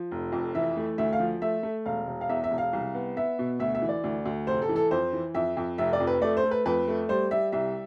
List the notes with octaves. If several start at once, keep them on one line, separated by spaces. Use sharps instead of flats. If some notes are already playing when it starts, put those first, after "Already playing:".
Already playing: F3
F1
F2
E3 E5
A3
D2 E5
F5
F3
A3 E5
A3
E1 F5
E1
F5
E2 E5
E5
E1
F5
C2
B3
B3 E5
B2
D2 E5
E5
E3
D5
D2
D2
F1 C5
A4
E3
A4
F2 C5
E3
F2 E5
F2
F1 E5
D5
F2
B4
A3 D5
C5
A3
B4
F2 B4
A3
G3 C5
G3 E5
C2 E5